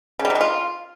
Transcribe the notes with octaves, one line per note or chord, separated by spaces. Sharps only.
C#3
G3
C3
G#3
F4